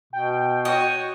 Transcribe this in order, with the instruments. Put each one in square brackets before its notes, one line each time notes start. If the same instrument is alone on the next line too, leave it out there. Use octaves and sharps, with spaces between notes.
[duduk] B2 [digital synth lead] G5
[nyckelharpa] F#4 C#5 [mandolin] D#5